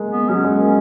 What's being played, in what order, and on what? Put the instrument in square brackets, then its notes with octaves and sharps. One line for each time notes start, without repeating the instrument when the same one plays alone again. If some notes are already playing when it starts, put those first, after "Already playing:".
Already playing: [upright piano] G#3 A#3
[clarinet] B3
[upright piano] F#3 [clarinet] C#4
[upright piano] G#3
A#3